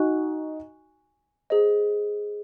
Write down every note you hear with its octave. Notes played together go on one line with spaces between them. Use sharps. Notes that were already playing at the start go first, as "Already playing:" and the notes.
Already playing: D#4 F#4 G#5 C#6 F#6
G#4 C5 D#5